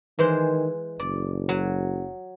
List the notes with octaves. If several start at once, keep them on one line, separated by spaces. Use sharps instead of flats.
D#3 E3 G#3 C5
F#1 D5
F#3